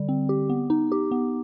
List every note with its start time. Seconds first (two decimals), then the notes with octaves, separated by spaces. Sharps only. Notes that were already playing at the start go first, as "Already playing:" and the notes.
Already playing: D3 G3
0.09 C4
0.29 G4
0.50 B3
0.70 D#4
0.92 G4
1.11 B3